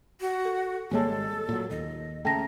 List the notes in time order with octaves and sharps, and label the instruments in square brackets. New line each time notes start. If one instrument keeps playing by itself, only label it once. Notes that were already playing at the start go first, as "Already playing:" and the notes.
[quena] F#4
[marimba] A4
[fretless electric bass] G#1 G3 G#3 [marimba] A#3 C#5 A5 [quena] A4
[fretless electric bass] A#2 F#3
[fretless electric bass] D#2 [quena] D#5
[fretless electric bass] C#3 A3 [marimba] G5 A5 A#6 [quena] A#5